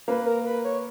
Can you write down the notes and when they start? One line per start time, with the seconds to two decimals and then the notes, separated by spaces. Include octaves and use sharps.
0.08 A#3 B4
0.26 A#4
0.46 B4
0.65 C#5